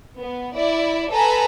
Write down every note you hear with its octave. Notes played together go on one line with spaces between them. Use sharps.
B3
E4 D5
A4 B4 G#5 A#5